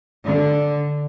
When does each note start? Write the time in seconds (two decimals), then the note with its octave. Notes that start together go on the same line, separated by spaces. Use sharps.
0.25 D3